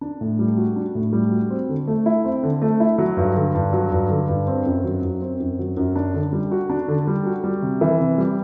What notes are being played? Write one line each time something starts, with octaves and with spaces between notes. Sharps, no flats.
D4
A2
G3
F#4
D4
A2
G3
F#4
C4
D3
A3
E4
C4
D3
A3
E4
F#3
G2
D3
G2
F#3
G2
D3
G2
C4
F#2
F#3
F#2
C4
F#2
F#3
F#2
D4
D3
G3
F#4
D4
D3
G3
F#4
G3
C3
E3
C3
G3